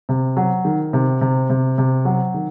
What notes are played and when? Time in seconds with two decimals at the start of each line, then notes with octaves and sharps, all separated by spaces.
0.09 C3
0.37 F#3
0.65 D#3
0.93 C3
1.21 C3
1.50 C3
1.78 C3
2.05 F#3
2.34 D#3